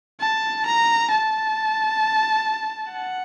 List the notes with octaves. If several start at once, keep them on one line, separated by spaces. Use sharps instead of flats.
A5
A#5
A5
F#5